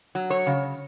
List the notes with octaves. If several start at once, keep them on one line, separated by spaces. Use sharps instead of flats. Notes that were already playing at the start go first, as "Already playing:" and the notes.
F#3
C#5
C#3